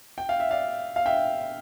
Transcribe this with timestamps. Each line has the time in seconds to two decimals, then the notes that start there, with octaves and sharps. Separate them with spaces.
0.18 G5
0.29 F5
0.40 E5
0.50 D5 F5
0.96 F5
1.06 E5 G5